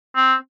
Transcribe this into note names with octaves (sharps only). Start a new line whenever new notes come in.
C4